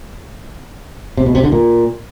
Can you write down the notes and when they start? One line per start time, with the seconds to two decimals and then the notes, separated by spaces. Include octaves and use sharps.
1.17 C3
1.26 B2
1.35 C3
1.43 D3
1.52 A#2